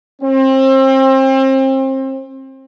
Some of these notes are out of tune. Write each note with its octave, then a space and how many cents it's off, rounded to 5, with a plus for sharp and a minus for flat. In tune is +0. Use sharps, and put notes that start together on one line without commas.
C4 +30